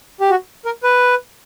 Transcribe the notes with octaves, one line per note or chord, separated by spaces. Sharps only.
G4
F#4
A#4
B4